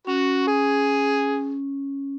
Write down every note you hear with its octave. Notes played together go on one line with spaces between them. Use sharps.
C#4 F#4
G#4